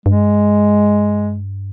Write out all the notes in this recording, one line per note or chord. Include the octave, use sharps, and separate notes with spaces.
G2 G#3